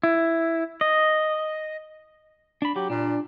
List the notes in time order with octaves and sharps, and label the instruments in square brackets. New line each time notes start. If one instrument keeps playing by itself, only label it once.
[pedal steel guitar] E4
D#5
D4 B5
[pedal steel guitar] F#3 [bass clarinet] G4
[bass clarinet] A#2 [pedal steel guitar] D4